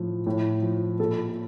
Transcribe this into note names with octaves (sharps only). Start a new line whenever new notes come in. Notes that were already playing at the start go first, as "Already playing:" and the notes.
Already playing: A2 F3
A2
F3
A#2 A4